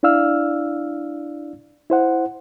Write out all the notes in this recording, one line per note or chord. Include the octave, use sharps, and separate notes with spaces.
D4 E4 D5 F5 E6 F6
E4 C5 F#5